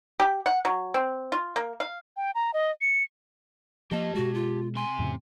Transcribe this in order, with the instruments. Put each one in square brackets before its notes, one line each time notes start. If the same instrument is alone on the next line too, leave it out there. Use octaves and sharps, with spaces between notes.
[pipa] G4
F#5
F#3
C4
F4
A#3
F5
[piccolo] G5
A#5
D#5
C#7
[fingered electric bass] F3 A#3 [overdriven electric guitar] G4 A5 [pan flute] D#5
[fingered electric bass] B2 G#3 [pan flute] F#4
[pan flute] F4
[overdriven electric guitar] C3 C6 [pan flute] G#5
[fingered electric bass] F2 A2 C#3